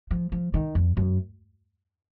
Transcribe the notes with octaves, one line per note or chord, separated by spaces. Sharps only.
F3
F3
D#3
F2
F#2